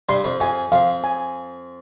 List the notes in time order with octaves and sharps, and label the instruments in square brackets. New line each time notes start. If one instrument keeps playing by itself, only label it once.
[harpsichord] G2 G3 [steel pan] C6
[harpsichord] F2 F3
[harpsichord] F2 F3 [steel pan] G#5
[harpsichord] F2 F3 [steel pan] F5
[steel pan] G#5